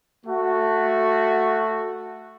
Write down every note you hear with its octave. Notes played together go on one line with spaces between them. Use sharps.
A3 F#4